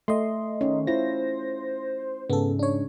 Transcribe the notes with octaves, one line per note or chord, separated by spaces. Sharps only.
A3 D#5 C6
D#3 C#4
E4 F4 C5 A#6
G#2 C#3 B3 A4
D4 C#5